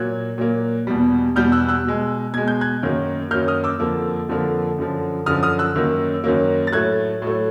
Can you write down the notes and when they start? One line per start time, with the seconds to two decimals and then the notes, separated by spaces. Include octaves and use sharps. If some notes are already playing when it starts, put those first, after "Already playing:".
Already playing: A#2 F#3 A#3 F#6 G#6
0.38 A#2 F#3 A#3
0.87 E2 B2 G3
1.36 E2 B2 G3 F6 G6
1.52 E6 F#6
1.69 E6 F#6
1.85 B2 G#3
2.34 B2 G#3 G#6
2.48 G6
2.61 F#6 G#6
2.83 F#2 D#3 F#3 A#3
3.31 F#2 D#3 F#3 A#3 F6 G6
3.48 D#6 F6
3.64 D6 E6
3.80 F2 D3 F3 A#3
4.29 F2 D3 F3 A#3
4.78 F#2 D3 F3
5.26 F#2 D3 F3 D#6 F6
5.43 D#6 F6
5.59 E6 F#6
5.75 F#2 D#3 F#3 A#3
6.24 F#2 D#3 F#3 A#3
6.67 A6
6.73 A2 F#3 A3 F#6 G#6
7.22 A2 F#3 A3